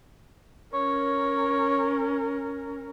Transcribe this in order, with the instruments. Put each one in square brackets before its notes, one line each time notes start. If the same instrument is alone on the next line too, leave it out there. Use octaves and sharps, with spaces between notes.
[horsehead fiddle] C#4 A#4 [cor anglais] C#5